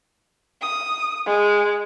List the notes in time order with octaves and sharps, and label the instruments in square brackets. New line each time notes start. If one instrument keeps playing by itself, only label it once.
[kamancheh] D#6
G#3